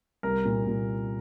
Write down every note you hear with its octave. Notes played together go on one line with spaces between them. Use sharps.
C2 A#4
A#2
A#2